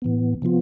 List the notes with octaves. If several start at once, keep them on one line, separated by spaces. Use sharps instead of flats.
A2 E3 B3
C3 F3 B3 F4